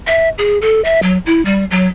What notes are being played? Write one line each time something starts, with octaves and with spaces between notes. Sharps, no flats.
E5
G#4
A4
E5
F#3
E4
G3
F#3